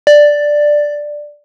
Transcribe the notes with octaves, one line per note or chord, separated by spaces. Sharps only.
D5